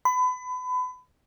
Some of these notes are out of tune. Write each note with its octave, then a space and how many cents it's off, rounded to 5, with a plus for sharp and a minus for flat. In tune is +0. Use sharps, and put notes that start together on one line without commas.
B5 +30